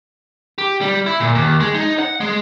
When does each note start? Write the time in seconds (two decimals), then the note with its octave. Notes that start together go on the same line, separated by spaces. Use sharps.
0.58 G4
0.81 G3
1.06 E4
1.20 A#2
1.35 D#2
1.60 G#3
1.74 D#4
1.99 F#5
2.21 G#3